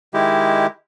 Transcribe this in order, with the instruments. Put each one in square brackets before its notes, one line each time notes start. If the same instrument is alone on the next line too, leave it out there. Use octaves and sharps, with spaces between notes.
[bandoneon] D#3 G#3 E4 G4